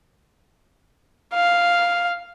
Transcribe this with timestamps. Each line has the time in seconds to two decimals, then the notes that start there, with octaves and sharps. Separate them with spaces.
1.34 F5